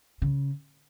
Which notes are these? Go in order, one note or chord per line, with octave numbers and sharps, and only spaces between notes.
C#3